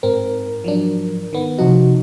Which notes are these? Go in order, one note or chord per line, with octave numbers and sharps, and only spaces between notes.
G#2 C4 A#4
F3 F#3 D4
D#3 B3
C3 F3 D#4 F#4